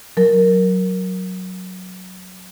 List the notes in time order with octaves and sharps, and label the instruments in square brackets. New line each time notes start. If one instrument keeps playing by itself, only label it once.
[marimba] F#3 A#4